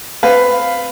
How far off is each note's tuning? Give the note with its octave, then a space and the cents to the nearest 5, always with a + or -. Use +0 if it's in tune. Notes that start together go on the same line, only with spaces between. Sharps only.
C4 +0 B4 +10 F5 +0